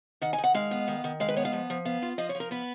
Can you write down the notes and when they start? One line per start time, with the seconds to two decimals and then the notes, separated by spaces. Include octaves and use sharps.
0.21 D#3 F#5
0.33 G#5
0.38 D#3
0.44 F#5
0.54 G#3 F5
0.71 B3
0.88 D#3
1.04 D#3
1.20 G#3 F5
1.28 B4
1.37 B3 C#5
1.45 F5
1.53 F3
1.70 F3
1.85 B3 F5
2.02 F4
2.18 F3 D#5
2.29 C#5
2.35 F3
2.40 A#4
2.51 B3 B4